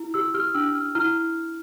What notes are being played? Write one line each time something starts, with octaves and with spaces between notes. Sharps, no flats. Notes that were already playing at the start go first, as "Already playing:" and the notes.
Already playing: E4
G4 E6
G4 F6
D4 E6
D4 F6
E4 F6